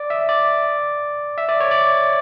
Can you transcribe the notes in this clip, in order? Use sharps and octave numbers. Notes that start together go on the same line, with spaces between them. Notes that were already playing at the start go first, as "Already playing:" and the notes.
Already playing: D5
E5
D5
E5
D5
C#5
D5